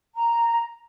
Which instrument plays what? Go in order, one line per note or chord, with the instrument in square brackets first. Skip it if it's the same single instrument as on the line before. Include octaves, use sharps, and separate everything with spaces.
[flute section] A#5